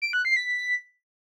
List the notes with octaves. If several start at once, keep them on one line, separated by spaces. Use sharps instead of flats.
D7
F#6
C7
B6